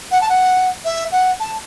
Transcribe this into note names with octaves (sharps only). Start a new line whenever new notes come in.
F#5
A5
F#5
E5
F#5
A5